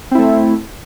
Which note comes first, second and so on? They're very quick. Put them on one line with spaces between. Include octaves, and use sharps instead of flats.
C4 E4 A3